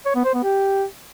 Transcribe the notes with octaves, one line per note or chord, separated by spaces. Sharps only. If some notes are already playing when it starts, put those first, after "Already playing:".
C#5
B3
C5
B3
G4